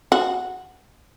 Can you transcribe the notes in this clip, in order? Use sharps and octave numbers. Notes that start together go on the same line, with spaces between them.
F#4